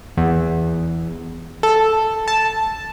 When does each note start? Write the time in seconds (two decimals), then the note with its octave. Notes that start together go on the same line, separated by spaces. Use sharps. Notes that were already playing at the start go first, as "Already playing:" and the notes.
0.17 E2
1.63 A4
2.28 A5